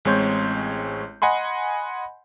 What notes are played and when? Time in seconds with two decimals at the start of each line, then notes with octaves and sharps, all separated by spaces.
0.05 A1 G#3 C4 C#5 C6 G6
1.22 D#5 F#5 G#5 B5 C6